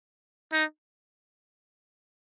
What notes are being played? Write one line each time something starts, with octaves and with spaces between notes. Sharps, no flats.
D#4